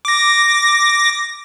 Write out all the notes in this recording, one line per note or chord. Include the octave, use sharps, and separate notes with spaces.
D6 A#6